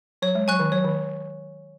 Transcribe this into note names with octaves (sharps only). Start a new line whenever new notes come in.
F#3 C#5
G#3
F#3 G#5 C#6 F#6
D#3
F#3 C#5
D#3